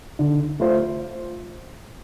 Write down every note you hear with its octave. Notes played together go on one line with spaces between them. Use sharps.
D3
A3 F4 C5